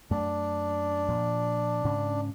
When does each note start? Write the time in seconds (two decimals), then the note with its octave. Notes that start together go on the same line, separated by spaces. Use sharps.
0.11 F#2 A3 D4
1.09 A#2 F3
1.84 G#2 C#3 C#4